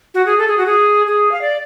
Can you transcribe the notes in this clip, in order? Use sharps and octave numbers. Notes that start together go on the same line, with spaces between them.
F#4
G#4
A4
G#4
F#4
G#4
G#4
F5
D5